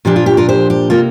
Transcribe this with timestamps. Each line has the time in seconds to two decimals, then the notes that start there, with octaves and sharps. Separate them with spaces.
0.05 A#2 F3 D4 G4
0.16 F4
0.26 G4
0.37 F4 A#4
0.49 G4 C5
0.70 G4
0.90 C3 A#3 F4 A#4